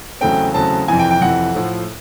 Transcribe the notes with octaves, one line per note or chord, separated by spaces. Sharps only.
E2 C#3 F#3 A3 C4 G5
E2 C#3 F#3 A3 C4 A5
F2 C3 E3 G#5
G5
G5
F2 C3 E3 F#5
A2 F3 A3